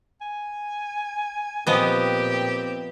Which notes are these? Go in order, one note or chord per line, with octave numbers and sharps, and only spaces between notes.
G#5
A#2 F3 B3 C4 G4 D#5